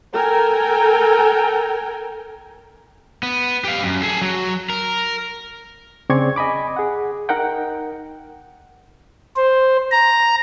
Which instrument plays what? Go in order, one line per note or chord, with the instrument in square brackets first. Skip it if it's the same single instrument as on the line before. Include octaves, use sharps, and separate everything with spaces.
[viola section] A4 A#4 G5 G#5
[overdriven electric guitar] B3
G4 F5
F#2
G#4 A4
F#3
A#4
[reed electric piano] C#3 C4 G#4 D5 C#6 G#6
D#5 G#5 B5 D6
G#4 F#5
D#4 A#4 F#5 G5
[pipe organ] C5
A#5